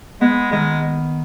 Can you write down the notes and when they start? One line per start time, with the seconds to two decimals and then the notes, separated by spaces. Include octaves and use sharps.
0.21 G#3 B3
0.52 D#3 G#3